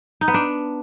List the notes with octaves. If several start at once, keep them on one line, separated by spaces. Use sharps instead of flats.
D#4
B3
D4